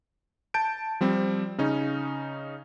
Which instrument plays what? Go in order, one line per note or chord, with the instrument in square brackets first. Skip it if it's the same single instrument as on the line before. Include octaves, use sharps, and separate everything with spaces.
[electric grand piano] A5 G6 D7
F3 G3 C4
C#3 C#4 D#4